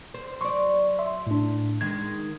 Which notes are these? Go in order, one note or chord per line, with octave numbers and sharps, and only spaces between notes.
C5
F#3 D5 C6 C#6
E5 C6
A2 D4
D#3 G#3 G#6